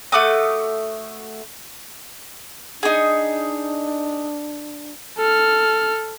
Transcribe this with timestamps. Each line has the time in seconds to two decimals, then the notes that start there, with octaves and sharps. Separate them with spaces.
0.12 A3 F#4 D6 D#6
2.83 D4 D#4 G#4
5.18 A4 F6